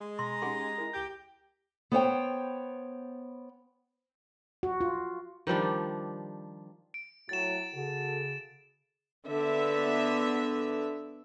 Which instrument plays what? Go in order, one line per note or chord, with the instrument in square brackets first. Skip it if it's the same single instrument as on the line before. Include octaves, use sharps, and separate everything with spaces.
[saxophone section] G#3
[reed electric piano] B2 [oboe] A#5 [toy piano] C6
[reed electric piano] C#4 D#4 G4 [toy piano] G#4 F#5 C6
[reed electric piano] E4 A#4
[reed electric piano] C#2 G6 [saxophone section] G4
[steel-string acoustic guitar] B3 C5 C#5 G5
[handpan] F#4
F4
[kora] D#3 F3 G3 D4
[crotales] D7
[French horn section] A2 F#3 [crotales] A6 E7
[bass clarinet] C#3 [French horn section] F#4 A4
[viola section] D3 B3 E5